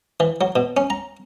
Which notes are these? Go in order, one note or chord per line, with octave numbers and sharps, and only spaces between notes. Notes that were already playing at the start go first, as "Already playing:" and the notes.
E3
F#3
B2
C#4
A#5